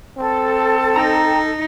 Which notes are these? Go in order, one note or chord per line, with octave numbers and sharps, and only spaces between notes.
C4 A4
D#4 G5 A#5